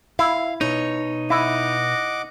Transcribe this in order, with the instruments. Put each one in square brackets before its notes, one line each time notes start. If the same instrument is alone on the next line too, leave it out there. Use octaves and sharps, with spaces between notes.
[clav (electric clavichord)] E4 [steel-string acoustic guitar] F5
[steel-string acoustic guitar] B2 C#5 [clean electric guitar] D#4
[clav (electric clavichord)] E4 [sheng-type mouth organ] D#5 F#5 D6